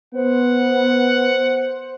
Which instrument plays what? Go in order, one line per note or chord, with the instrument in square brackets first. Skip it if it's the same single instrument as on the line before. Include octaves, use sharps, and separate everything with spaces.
[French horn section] B3 [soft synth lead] C5 [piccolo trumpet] F#5